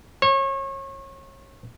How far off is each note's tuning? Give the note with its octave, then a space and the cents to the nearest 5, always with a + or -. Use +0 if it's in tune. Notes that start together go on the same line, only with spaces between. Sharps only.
C#5 -30